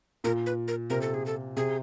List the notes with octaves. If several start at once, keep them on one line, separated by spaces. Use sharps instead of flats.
A#2 A#4
B4
A#4
C3 A#4
A4
G#4
A4
C3 G#4